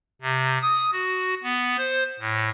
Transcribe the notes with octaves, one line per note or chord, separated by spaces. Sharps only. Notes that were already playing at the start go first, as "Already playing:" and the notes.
C3
D#6
F#4
B3
C5
A2